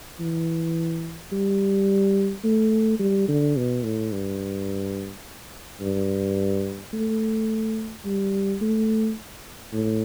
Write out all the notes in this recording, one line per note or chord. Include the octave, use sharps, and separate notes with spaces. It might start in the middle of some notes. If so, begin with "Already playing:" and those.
E3
G3
A3
G3
D3
B2
A2
G2
G2
A3
G3
A3
A2